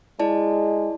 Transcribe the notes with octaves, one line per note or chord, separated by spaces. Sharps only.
G#3 E4 D5 A5